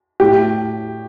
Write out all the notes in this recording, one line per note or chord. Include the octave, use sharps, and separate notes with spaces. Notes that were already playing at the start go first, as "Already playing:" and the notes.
A2 G4